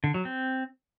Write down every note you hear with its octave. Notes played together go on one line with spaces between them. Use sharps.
D3
F#3
C4